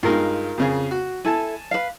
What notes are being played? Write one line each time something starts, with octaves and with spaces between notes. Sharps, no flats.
G2 G#3 D#4 F4 A#4
F2 C#3 G#4
F#4
E4 A4 G#5 A5
B4 F5